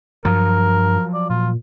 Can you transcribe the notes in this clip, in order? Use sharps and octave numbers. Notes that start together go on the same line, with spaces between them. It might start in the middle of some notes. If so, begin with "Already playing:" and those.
G2 F3 F#3 A#4
D5
A#2 F4